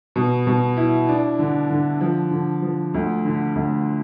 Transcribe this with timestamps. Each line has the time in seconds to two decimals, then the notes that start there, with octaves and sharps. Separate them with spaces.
0.16 B2
0.47 B2
0.77 E4
1.09 D4
1.39 D3
1.70 D3
2.01 F3
2.31 D3
2.62 F3
2.94 D2
3.25 D3
3.55 D2